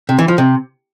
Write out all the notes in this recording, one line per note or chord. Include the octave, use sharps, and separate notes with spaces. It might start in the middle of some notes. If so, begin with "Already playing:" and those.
C3
E3
F3
C3